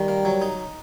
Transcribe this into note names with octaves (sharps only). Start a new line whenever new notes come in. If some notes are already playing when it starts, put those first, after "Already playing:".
Already playing: D#3 G3
A#3
F#3
D#4